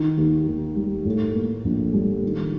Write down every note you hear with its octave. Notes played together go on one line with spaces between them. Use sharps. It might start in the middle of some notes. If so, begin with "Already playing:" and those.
Already playing: D#3
D#2
D#2
G3
A2
A#3
A#1
G3
D#3